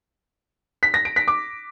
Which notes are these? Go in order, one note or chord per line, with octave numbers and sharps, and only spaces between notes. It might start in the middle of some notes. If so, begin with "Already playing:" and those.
B6
A#6
D7
B6
D6